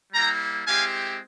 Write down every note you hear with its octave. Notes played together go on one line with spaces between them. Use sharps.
G3 A#3 E4 G5 A#5
G#3 C4 E4 G4 F5 G#5